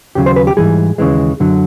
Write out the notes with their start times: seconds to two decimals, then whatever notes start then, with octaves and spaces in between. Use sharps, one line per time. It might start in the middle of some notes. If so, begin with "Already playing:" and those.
0.15 D#2 C#3 F#3 G4
0.26 C5
0.36 B4
0.47 G4
0.57 G#2 E3 G3 G#4
0.98 D#2 C#3 E3 G#3
1.40 F#2 D3 F#3